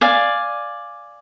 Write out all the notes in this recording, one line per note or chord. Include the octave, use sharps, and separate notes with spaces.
D5 F5 G#5